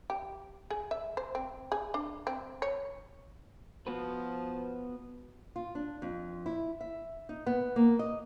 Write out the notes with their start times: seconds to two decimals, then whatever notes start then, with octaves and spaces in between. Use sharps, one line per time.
0.10 G4
0.70 G#4
0.91 E5
1.17 C5
1.35 C4
1.72 G#4
1.94 D4
2.27 C4
2.62 C#5
3.87 F3 B3 F#4 B4
5.56 F4
5.75 D4
6.02 F2
6.46 E4
6.81 E5
7.29 D#4
7.46 B3
7.76 A#3
7.99 D#5